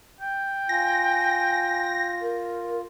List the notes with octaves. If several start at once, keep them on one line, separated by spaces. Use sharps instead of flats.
G5
F4 G#5 A#6
A#4